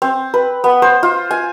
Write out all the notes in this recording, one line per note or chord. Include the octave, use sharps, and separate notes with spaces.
C4
B4
B3
C5
F4
G#5